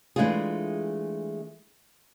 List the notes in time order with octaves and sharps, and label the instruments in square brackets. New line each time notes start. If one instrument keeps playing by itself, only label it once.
[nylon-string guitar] E3 G#3 A3 D4 F4 G#4